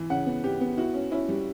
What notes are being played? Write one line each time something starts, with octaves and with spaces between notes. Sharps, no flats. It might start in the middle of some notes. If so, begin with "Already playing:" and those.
Already playing: E3
C#3 F#5
B3
B3 G4
B3
E4 F#4
C#4
C#4 E4
G3